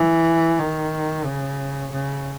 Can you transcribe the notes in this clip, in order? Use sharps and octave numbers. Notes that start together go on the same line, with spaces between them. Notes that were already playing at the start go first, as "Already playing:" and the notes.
Already playing: E3
D#3
C#3
C#3